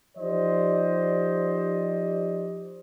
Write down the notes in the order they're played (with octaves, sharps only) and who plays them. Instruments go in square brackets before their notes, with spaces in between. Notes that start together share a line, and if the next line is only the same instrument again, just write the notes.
[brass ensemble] F3 D#4 G4 C5 D5 D#5